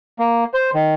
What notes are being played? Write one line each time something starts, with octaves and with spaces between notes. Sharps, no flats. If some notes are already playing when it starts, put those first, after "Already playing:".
A#3
C5
D#3